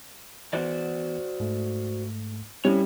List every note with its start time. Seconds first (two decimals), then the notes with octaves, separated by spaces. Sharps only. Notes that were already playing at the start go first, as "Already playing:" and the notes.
0.53 E3 B3 F#4 C5 D5
1.40 G#2 A3
2.65 G3 C4 C#4 E4 C#5